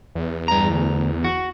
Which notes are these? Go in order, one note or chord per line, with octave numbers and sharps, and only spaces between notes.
E2
G2 A#5
D2
F#4